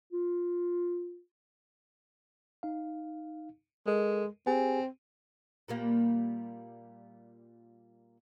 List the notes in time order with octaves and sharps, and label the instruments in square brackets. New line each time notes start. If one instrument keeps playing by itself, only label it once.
[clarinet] F4
[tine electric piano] D#4 F5
[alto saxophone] G#3 [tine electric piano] A4 A#4 D#5
[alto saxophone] C4 [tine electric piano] G4 G#4 G#5
[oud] A#2 G3 A#3